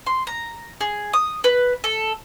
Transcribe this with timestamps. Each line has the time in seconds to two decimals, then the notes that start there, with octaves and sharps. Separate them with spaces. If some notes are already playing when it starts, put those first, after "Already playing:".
0.06 C6
0.27 A#5
0.81 G#4
1.13 D#6
1.44 B4
1.84 A4